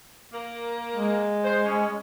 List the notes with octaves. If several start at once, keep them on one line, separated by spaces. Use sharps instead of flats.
A#3
G#3
C5
C#4